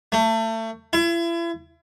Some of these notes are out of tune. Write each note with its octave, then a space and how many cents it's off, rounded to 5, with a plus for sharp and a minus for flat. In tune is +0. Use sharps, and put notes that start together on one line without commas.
A3 +30
E4 +40